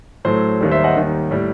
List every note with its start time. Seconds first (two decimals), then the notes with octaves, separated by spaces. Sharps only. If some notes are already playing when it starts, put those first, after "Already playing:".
0.25 A2 F#3 A3 C5
0.61 D#2 D#3 G3
0.71 C5 E5
0.84 D#5 F#5
0.95 D#2 D#3 G3
1.31 A2 G3